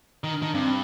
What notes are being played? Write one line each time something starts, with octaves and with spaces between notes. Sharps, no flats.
D#3
D4
D#3
G2 C4